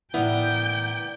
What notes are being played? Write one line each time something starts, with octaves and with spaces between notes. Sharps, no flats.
A2 D3 B3 E4 A#4 G5